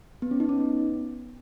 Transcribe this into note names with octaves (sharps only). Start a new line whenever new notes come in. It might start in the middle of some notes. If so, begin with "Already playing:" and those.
B3
C#4
D#4
C#4
B3